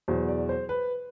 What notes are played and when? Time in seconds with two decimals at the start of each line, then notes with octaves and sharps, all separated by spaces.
0.08 E2 B2 F#3 C5
0.29 D5
0.49 C5
0.69 B4